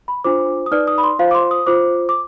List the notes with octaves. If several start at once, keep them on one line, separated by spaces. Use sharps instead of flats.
B5
D4 F4 C5 D6
D#6
D#4 B4 D5 F6
D#6
B5
C6
F4 C5 F5
D6
C6
D#6
F4 C5 D6
D6